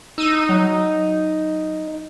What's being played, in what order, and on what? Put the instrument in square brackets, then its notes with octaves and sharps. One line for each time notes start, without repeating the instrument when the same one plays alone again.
[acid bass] D#4 [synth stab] E6 D#7
[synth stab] F#3